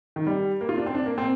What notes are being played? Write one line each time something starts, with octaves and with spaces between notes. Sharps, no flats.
D#3
G3
A#3
F4
D4
C4
D4
A#3
C4